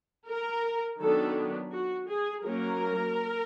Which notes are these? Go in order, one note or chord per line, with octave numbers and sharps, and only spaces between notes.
A#4
D#3 F#3 B3 D4 A4
F#4
G#4
F#3 A#3 C#4 A#4